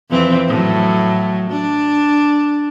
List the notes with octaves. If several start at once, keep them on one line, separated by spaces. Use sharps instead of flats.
F2 E3 C4
A2 F#3
D4